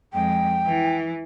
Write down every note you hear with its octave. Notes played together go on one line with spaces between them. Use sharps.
F2 G#3 G5
E3